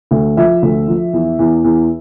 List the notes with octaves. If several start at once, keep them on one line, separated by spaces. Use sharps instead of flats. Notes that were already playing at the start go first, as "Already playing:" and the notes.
D2
F3 E5
D2
F3
E2
E2
E2